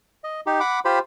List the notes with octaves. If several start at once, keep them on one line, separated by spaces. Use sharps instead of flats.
D#5
D#4 G4
F#5 B5 D6
F4 G4 C5 B5